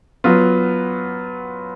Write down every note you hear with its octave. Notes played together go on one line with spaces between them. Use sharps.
F#3 B3 F4